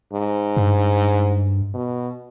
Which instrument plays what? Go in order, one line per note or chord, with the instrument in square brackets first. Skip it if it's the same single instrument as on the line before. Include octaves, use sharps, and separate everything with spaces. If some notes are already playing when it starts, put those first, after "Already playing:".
[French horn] G#2
[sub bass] G2
[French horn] B2